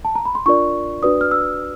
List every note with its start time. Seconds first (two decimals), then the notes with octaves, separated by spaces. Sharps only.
0.05 A5
0.15 A#5
0.25 B5
0.35 C6
0.46 D4 F4 A#4 D5 C#6
1.03 D4 F#4 B4 D5 D#6
1.21 F6
1.31 E6